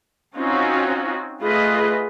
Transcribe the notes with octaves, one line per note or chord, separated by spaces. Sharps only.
C4 C#4 D#4 F4 F#4
A3 F4 G#4 B4 D#5